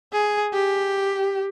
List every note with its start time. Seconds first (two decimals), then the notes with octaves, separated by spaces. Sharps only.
0.13 G#4
0.53 G4